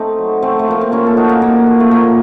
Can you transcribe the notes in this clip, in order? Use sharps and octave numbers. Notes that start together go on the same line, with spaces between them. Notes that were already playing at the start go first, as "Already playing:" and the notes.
Already playing: A3 C4 D#4
F#3
C3 A3 C4
A3
F3 A#3
C4
C3 A#3 C#4
A4
F3 D#4 F#4
A#3 C#4
A#2 A#3
F3
A3
A#2 A#3